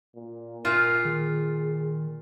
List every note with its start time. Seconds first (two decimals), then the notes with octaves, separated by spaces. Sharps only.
0.15 A#2
0.65 A#2 F4 A#4
1.05 D#3 G#4